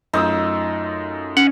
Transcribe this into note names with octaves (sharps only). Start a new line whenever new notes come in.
F#2 A3 D#4 F4 D#6 E6
C#4 F#5